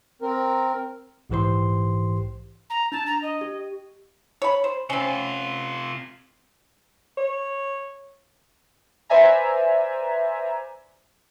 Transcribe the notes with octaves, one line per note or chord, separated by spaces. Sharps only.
C4 A#4
A#1 G#2 E3 G4 C5 C6
A#5
D4 A5
A#5
D#5
G4
C#5 B5
C5
C3 C4 C#4 F4
C#5
B4 C5 D5 E5 G#5 A#5